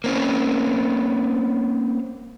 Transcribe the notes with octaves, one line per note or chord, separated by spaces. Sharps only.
A#3 C4 C#4